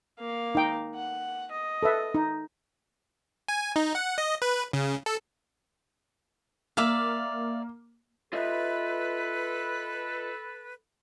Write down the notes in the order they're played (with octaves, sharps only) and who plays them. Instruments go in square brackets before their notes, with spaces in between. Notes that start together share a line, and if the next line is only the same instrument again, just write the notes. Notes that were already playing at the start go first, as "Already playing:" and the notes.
[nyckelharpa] A#3 F5
[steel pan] D#4 G5
[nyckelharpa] F#5
D#5
[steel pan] A4 B4 E5
D#4
[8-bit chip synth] G#5
D#4
F#5
D#5
B4
C#3
A4
[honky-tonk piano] A#3 [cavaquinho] D5 E5 F5
[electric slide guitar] F4 D#5 E5 [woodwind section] A4 B4